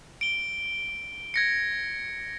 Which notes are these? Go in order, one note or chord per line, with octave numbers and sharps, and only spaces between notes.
D7 G7
G#6 A#6 C#7